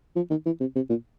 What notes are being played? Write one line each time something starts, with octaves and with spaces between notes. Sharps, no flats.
F3
D#3
E3
C3
C3
A#2